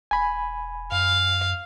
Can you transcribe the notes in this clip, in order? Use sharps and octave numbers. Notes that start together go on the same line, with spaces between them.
E1 G#5 B5
F#2 F5